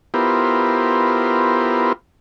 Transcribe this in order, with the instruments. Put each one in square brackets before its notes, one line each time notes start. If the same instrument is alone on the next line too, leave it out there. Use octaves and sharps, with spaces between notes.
[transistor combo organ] B3 E4 F4 G4 A#4 C5